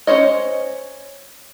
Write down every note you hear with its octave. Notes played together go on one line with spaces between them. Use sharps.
C#4 F#4 C5 C#5 D#5